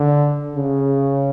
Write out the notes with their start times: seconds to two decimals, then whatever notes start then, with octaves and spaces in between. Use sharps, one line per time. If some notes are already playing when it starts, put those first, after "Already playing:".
Already playing: D3
0.56 C#3